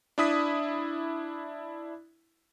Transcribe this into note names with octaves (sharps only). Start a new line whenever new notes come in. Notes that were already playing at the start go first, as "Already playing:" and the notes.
D4 E4 D#6 B6